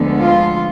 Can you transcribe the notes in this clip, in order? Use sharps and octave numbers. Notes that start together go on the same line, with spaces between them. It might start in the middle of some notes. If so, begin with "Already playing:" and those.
Already playing: D2 D3 F3 G#3 B3
F4